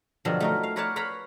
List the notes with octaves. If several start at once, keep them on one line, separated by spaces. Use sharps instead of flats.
G2 B2 D3 F3 F#3 D4
A3 D#4 A#4
F5
A#4 B4 C#5 D5 F#5 A5
B4 C#5 F5 A#5 B5